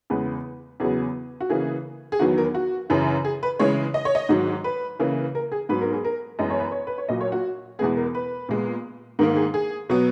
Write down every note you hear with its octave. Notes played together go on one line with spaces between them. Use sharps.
E2 C#3 G#3 B3 B4
E2 C#3 F#3 B3 G#4
F#4
C#3 E3 A#3 G#4
G#4
E2 D#3 F#3 B3 F#4
A#4
F#4
F#2 C#3 E3
G#4
B4
C#3 E3 G#3 C#5
D#5
C#5
D#5
G#2 D#3 F#3
B4
C#3 E3 A#3
A#4
G#4
G#2 F#3 B3 B4
A#4
G#4
A#4
F#2 E3 G#3 B3 D#5
C#5
B4
C#5
B4
C#5
A#2 F#3 A#3 D#5
C#5
F#4
E2 B2 G#3 B3 G#4
A#4
B4
A#2 G#3 B3
G#2 D#3 A#3 A#4
G#4
G#4
B2 F#3 B3